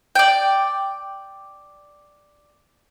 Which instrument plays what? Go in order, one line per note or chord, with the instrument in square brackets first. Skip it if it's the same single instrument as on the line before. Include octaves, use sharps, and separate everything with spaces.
[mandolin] D5 G5